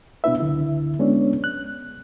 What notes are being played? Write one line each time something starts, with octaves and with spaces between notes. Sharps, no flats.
B2 B3 D4 E4 B4 E5
C#2 D3 E4
G#3 B3 C#4 D4 C#5 D5
F#6